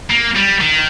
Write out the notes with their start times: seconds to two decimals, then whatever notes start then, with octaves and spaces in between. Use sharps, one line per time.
0.10 A#3
0.35 G3
0.60 D#3